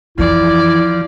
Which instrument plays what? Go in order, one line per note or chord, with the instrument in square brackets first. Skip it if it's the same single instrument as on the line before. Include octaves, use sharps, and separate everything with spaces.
[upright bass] F2 E3 [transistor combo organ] F3 [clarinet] E4 [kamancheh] D5